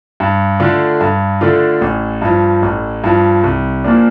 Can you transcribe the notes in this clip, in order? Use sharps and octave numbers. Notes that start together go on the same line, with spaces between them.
G2
D3 A3 D4 F4
G2
D3 A3 D4 F4
A1
G2 F3
A1
G2 F3
C2
A#2 F3 A#3 D4